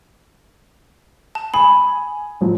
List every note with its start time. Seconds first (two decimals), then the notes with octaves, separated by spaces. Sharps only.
1.35 A5
1.54 G#5 B5 D#6
2.41 A1 F3 F#3